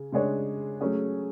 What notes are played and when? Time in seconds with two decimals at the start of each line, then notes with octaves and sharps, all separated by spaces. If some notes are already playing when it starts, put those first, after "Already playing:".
Already playing: C#3 G#4
0.12 C#3 G#3 D4 G#4 C#5
0.81 F#3 A3 C#4 G#4